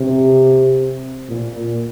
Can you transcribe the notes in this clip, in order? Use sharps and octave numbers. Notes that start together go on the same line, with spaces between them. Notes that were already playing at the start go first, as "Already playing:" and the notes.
Already playing: C3
A#2